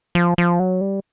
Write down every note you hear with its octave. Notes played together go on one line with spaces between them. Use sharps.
F3
F3
F#3
G3